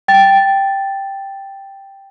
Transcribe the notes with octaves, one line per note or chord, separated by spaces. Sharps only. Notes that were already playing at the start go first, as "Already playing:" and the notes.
G5 A6